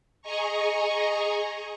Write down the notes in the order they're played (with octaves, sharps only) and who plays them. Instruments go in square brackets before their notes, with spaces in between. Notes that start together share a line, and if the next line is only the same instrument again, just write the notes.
[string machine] G#4 D#5 G#5 A#5 C#6